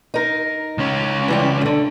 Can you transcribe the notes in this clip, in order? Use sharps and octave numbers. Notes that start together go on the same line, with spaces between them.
D#4 A#4
C#2 C#4
E3 G3 G4
D3 A3